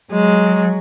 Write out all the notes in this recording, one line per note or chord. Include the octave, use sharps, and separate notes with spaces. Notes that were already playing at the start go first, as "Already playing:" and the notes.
F#3 G#3